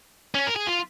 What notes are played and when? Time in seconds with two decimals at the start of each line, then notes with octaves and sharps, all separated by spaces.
0.35 C#4
0.47 A#4
0.56 G#4
0.67 F4